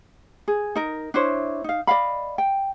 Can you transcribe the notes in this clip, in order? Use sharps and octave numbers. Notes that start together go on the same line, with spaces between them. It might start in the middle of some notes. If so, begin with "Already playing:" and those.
G#4
D#4 A#4
D4 E4 C5 C#5
D#4 F5
D5 D#5 F5 B5
G5